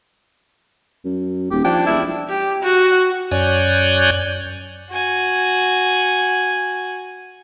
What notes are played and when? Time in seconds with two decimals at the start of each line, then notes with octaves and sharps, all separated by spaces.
1.05 F#2
1.51 D#1 G4
1.65 F3 D4 G5
1.86 E1 E4
2.29 G4
2.62 F#4
3.31 F#2 C#5 D5 G#5 F#6 G6
4.90 F#4 G#5